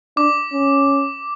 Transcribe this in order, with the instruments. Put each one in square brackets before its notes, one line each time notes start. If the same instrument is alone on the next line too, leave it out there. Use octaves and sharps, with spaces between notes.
[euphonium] D4 [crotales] D6
[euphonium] C#4